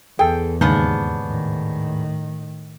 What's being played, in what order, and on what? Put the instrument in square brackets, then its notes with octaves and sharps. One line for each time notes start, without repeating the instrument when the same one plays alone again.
[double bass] E2 [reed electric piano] G#4 A4 [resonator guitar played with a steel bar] G5
[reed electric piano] D#2 G#2 G6 [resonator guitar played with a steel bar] C#3 B3 D4
[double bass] A2 D#3